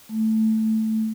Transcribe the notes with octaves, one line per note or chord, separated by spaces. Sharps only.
A3